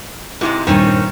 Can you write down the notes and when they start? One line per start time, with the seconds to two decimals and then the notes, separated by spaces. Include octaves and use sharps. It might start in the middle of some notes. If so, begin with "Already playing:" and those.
0.41 G#2 C3 G#3 E4
0.67 D#1 G2 D#3 C4 C#4